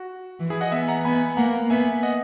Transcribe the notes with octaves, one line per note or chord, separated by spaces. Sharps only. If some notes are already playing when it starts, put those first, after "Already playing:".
Already playing: F#4
E3
E4 G#4
D#5 F#5
B3 E5 G#5
F#5 A#5
B3 G#5 B5
A#3 F#5 A#5
B3 E5 G#5
D#5 F#5